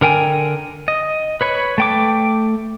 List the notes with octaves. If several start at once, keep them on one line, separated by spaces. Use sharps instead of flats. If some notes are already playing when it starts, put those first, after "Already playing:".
D3 A#4 G5 G#5
D#5
B4 C#5 B5
A3 G5 D6